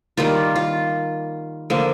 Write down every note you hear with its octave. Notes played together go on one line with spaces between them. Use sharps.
D#3 G3 A#3 F4
F4
D3 F3 A#3